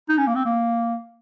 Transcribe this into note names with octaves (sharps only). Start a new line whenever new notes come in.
D#4
C#4
A#3
C4
A#3